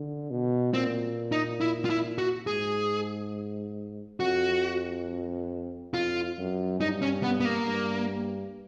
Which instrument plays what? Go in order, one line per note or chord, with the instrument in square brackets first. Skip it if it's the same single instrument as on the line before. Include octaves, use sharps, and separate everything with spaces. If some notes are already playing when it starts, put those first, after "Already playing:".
Already playing: [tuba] D3
B2
[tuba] A#2 [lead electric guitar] C4
[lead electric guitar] D#4
E4
F4
E4
F#4
[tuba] G#2 [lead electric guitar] G#4
[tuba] F2 [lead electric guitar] F#4
[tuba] F2 [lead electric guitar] F4
[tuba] F#2
[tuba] G2 [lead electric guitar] D#4
[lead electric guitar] C#4
B3
B3
A#3
[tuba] G2